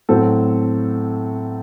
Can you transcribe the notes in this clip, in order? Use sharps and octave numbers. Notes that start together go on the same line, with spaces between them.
A2 F#3 C4 A4